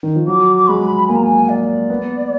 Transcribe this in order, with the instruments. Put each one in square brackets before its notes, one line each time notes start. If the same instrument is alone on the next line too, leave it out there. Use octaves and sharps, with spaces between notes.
[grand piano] D#3
F3
[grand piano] F#3 [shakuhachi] D6
[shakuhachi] D6
[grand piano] G#3 [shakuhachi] B5
[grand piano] A#3 [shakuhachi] G#5
[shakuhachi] A#5
G#5
D5
[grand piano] B3